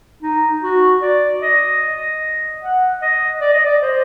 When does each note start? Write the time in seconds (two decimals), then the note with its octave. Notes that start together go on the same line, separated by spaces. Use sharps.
0.23 D#4
0.62 F#4
1.02 D5
1.42 D#5
2.62 F#5
3.02 D#5
3.41 D5
3.54 D#5
3.66 D5
3.82 C5